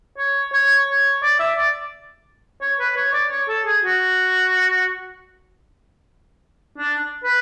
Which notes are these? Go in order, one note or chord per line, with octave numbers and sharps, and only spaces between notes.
C#5
C#5
C#5
D5
E5
D5
C#5
B4
C#5
D5
C#5
A4
G#4
F#4
D4
B4